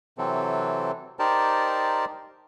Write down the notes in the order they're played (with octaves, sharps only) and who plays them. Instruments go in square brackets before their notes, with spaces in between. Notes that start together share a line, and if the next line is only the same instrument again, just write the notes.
[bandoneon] C3 E3 F#3 C4 A4
D#4 G4 A#4 C5 D5 A5